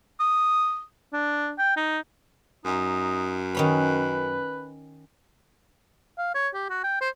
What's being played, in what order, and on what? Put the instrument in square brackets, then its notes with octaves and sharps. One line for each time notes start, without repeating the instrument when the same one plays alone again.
[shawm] D#6
D4
G5
D#4
[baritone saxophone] F#2 [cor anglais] D#4
[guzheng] D#3 C#4 B5 [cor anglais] B4
[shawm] F5
C#5
G4
F#4
G5
C5